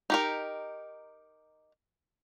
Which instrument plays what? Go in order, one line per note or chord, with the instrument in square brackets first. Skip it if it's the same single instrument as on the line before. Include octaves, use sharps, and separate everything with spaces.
[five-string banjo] D#4 G4 A#4